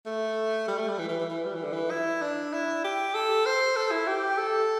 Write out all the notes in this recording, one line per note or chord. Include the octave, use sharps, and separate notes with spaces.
A3
G3
A3
G3
E3
E3
E3
E3
G3
E3
D3
E3
E4
D4
E4
G4
A4
C5
A4
E4
G4
A4